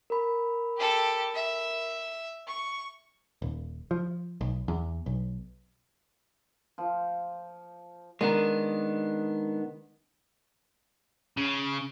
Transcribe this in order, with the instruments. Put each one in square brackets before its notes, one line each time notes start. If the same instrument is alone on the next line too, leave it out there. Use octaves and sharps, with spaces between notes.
[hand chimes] A#4 B5
[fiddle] G4 A4
E5
C#6
[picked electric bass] D#1
F3
B1
E2
B1
[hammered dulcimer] F3
[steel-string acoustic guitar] D#3 [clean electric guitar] G#3 B3 D4
[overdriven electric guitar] C#3